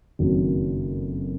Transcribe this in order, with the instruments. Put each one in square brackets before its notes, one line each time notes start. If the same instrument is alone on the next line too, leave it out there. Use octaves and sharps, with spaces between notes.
[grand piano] F#1 F2 D#3 F#3